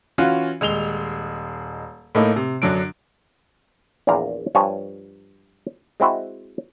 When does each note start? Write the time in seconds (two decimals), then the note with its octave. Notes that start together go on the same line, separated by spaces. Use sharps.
0.18 E3 C#4 F4 F#4
0.61 D#1 G#3 F7 G7
2.15 A2 A3 A#3 D#4
2.36 C3
2.62 F#2 D3 F#3 D4 D7
4.07 A#1 E2 A#2 D5 F5 A#5
4.55 G2 F3 C#5 G#5 A5
6.00 G#3 C4 E4 F#4